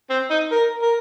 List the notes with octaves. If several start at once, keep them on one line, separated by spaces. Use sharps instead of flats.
C4
D#4
A#4
A#4